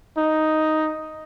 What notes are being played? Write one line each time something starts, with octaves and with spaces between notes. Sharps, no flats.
D#4